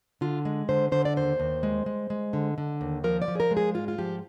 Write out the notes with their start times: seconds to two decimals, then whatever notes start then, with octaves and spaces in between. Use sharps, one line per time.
0.21 D3 F4
0.45 G#3
0.69 D3 C5
0.92 D3 C5
1.05 D5
1.16 D#2 C5
1.40 D#2
1.63 G#3
1.86 G#3
2.10 G#3
2.33 D3
2.58 D3
2.81 D#2
3.04 F3 A#4
3.22 D5
3.28 F3
3.35 G#4
3.40 A#4
3.51 G#3
3.57 G#4
3.74 G#2 F4
3.88 F4
3.98 F3 G4